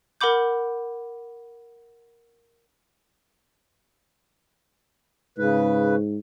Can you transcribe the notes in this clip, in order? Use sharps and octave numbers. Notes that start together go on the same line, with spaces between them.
A#4 F#5 B5 D6 G6
G#2 C#3 B4